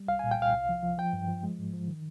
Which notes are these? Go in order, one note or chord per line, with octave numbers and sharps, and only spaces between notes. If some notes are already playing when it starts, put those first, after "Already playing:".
Already playing: G3
C2 F5
A#2 G#5
G5
C2 F5
C2
F3
F3
F3 G5
G2
F3
G#3
G#2
F3
D#3